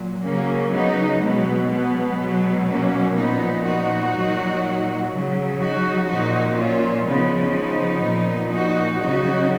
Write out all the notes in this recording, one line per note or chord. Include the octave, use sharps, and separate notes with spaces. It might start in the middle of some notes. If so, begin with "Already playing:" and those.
Already playing: A#2 F#3
C#3 F#3 A#3 C#4
B3 D#4
B2 F#3 G#3 B3
G#3 B3
B2 F#3
A#3 C#4
A#2 F3 B3 D#4
D#4 F#4
A#2 F#3
C#3 F#3
D#4 F#4
A#2 F3 D#4 F#4
C#4 F4
C#3 F3 B3 D#4
B3 D#4
A#2 F3
D#4 F#4
C#3 F#3 D#4 F#4